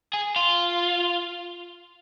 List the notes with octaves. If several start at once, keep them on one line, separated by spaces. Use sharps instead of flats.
G#4
F4